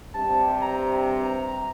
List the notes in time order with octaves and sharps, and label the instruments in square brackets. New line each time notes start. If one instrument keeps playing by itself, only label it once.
[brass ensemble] G2 C3 [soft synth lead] A5
[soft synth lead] A#5